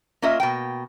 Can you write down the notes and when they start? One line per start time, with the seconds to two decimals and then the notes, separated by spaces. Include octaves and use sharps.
0.22 A#3 C#4 F4 D#5 E5
0.40 B2 A#3 G5